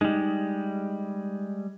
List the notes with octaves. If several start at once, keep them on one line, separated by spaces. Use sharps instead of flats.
G3 G#3 D#4